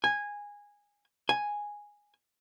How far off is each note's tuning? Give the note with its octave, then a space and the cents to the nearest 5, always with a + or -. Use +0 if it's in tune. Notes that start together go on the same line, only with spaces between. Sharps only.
G#5 -15
G#5 -5